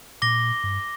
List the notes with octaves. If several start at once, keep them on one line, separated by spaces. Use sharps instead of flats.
A#2 D6 A#6 G7
G2